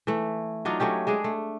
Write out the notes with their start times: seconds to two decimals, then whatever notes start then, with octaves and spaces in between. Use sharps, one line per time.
0.07 E3 A3
0.65 F#3 D4 D#4 F4
0.80 F#3 A3 C#4 G4
1.07 G#3 D4 G#4
1.24 A3